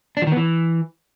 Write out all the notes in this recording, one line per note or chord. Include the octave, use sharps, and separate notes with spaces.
D4
F3
D#3
B3
E3